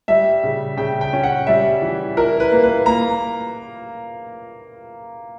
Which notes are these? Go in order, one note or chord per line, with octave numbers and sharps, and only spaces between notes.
G3 E5
C#3
C#3 G5
G5
C#4
F#5
G3 E5
E3
E4 A#4
B4
A#3
B4
A#3 A#5